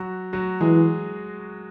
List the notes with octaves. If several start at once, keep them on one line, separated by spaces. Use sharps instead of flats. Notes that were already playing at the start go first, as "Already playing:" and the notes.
Already playing: F#3 F#4
F#3 F#4
E3 G#3 G#4